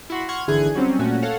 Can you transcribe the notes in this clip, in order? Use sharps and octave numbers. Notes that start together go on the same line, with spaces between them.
E4 F#4 C6
F#5 C6 C#6 F6 G#6
G#1 D3 E3 G#4 F#6 G#6
F#3 G3 C4 C#4
A#2 A3 C#4 F#4
A4 C#5 F5 F#5